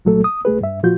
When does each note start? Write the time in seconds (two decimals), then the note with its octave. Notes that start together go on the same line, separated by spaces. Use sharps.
0.05 C2 A#2 F#3 A3 A4
0.24 D#6
0.45 C2 A3 G#4 B4
0.61 G2 E5
0.83 A#2 F3 F4 F#4 G6